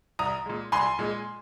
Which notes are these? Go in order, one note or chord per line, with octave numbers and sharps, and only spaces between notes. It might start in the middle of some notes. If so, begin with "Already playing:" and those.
C2 A#5 D#6
A#2 G#3
C2 G#5 C6
A#2 G#3